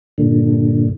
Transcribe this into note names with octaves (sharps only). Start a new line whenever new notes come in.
G2 A#2 D3